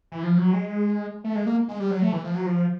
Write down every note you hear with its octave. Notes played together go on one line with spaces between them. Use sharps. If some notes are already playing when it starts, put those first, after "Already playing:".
E3
F3
F#3
G#3
A3
G#3
A#3
G#3
G3
F#3
A3
E3
F3
F#3
F3